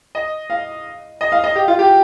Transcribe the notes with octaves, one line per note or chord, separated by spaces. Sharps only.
D#5
F5
D#5
F5
D#5
G4
F4
G4